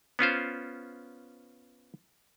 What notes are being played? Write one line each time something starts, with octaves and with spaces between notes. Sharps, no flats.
B3 C#4 F4 C5